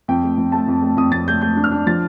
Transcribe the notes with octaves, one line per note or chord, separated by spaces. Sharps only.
F2 G5
A3
F2
A3 A5
F2
A3
F2 D#6
F2 A6
A3 G6
A3 G6
D4
F6
D4
F3 A6